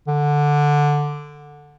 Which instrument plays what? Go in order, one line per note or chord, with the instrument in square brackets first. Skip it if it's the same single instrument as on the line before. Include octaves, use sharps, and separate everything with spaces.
[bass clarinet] D3